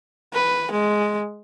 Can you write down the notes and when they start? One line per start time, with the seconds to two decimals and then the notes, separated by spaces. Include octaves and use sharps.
0.33 B4
0.71 G#3